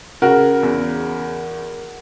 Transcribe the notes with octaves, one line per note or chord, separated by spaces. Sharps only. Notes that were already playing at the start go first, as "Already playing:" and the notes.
C#3 F#4 A#4
E2